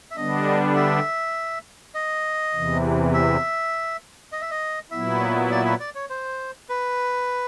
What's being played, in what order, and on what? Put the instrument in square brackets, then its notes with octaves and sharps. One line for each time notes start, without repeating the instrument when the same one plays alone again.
[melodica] E5
[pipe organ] D3 G3 B3 D4 [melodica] D#5
[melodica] E5
D#5
[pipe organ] E2 C3 E3
[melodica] E5
D#5
E5
D#5
[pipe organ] A#2 F#3 B3 E4 [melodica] E5
[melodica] D5
E5
D5
C#5
C5
B4